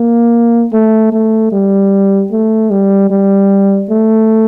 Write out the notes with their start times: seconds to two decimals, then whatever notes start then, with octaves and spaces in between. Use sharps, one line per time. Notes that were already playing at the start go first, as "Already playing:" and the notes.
Already playing: A#3
0.73 A3
1.12 A3
1.52 G3
2.32 A3
2.71 G3
3.10 G3
3.90 A3